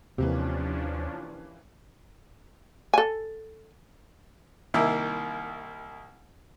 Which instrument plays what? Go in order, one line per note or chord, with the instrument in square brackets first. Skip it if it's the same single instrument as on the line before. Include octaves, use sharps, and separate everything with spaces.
[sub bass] D#2 [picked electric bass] C3 [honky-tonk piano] E3 A#3 G4 [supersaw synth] F3 C#4 D4
[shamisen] A4 G#5
[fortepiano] C2 D#3 A#3 E4 E5